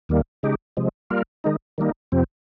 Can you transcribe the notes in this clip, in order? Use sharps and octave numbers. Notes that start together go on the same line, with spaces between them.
D#2 D#3 G3 A#3
C#3 G#3 D#4 G4
C3 F3 G#3
G3 A#3 F4 A#4
D#3 G#3 D#4
D#3 G3 A#3 D#4
F2 C3 F3 C4